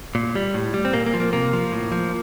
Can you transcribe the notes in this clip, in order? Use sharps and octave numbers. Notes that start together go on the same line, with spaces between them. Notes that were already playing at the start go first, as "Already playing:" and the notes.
A#2
G3
A2
G3
C4
A#2 A#3
A#3
F3
A#3
C3 A#3
F3
A2
F3